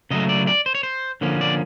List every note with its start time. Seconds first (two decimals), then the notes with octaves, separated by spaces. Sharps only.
0.11 C#3 F#3 A3 D#5
0.29 D5
0.47 D5
0.66 C5
0.75 C#5
0.83 C5
1.21 D3 F3 A#3 C#4
1.41 D5